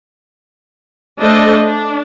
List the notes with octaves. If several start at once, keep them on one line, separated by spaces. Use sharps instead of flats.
A3 D4 A4 C5 D#5
D4